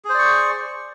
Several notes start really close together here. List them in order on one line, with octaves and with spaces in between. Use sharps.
G#4 C5 D5 C#6